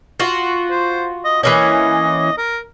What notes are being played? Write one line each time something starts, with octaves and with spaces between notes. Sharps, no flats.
F4 F#4
C5
D#5
E3 A#3 C#4 D#5
A#4